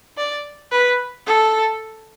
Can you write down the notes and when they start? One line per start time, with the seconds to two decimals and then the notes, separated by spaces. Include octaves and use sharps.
0.17 D5
0.71 B4
1.26 A4